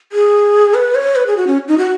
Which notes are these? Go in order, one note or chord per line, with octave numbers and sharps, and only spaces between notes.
G#4
B4
C#5
B4
G#4
F#4
C#4
D#4
F#4